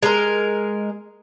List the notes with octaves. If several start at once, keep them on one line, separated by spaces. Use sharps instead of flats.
G#3 A#4